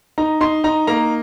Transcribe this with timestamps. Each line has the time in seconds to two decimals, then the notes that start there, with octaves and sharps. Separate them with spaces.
0.18 D#4 A#5
0.41 D#4 C6
0.64 D#4 A#5
0.87 A#3 A#5